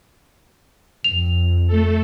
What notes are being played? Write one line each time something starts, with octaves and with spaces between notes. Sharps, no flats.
F2 F7
A3 A4